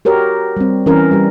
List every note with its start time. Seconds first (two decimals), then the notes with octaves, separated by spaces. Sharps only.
0.05 F#4 G4 A#4 C#5
0.57 G3 C4
0.86 E3 C#4 A#4
1.11 G3 G4